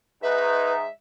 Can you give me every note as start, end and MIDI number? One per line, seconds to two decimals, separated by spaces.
0.23 0.85 44
0.23 0.85 63
0.23 0.74 71
0.23 0.90 76